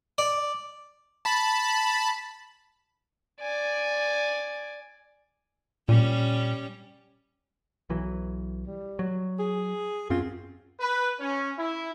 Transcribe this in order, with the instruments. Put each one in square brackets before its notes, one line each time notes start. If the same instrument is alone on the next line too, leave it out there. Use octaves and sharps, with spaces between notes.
[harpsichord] D5
[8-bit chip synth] A5 B5
[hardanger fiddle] D5 G#5
[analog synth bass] A#2 [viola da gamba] G3 C#4
[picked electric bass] B1 E3 F#3
[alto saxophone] G3
[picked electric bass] F#3
[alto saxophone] G#4
[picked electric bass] F#2 C4 C#4 [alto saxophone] F4
[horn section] B4
C#4
E4